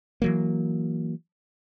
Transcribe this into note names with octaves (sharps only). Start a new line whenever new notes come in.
E3 F#3 A#3